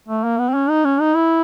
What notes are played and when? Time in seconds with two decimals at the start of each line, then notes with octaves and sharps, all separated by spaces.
0.09 A3
0.24 A#3
0.38 B3
0.49 C4
0.54 C#4
0.69 D#4
0.84 C#4
1.01 D#4
1.15 E4